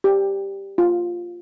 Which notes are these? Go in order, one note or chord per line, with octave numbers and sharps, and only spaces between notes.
G4
F4